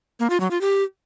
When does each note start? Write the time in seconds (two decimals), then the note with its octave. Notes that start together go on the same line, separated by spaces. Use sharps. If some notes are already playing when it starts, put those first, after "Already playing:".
0.20 A#3
0.30 F4
0.40 F#3
0.51 F4
0.61 G4